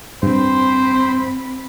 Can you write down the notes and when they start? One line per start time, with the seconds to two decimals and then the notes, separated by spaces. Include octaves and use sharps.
0.23 G2 C4 C5 B5